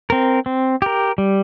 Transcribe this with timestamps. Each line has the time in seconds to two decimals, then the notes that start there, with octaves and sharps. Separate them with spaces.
0.10 C4 A#4
0.46 C4
0.82 G4 A#4
1.18 G3